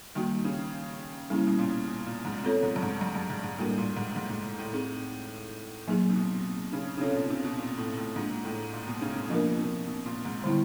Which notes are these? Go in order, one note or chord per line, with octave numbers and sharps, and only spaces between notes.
D#3 G3 A#3 D#4 F#4
C#3
C#3 G3 A#3 C#4 E4
B2
A#2
B2
A#2
G#2
A#2
B2 C4 F4 A4 C#5
G#2
G2
G#2
G2
G2
G#2
G#2
A2 G3 A#3 D4 F#4 A#4
A#2
G#2
G#2
G#2
A2
C4 D#4 G#4
A#2 F#3 A#3 D#4 G#4
C3
B2
C#3
C#3
C3 C#4 F4 A4 C#5
A#2
B2
C3
B2
A#2
A2
A2
G#2 A#3 D4 F4
A2
A#2
B2
C#3
C3
B2 F3 A#3 D4 F4 A#4
C3
B2
A#2
G#2
D3 D#3 G3 B3 E4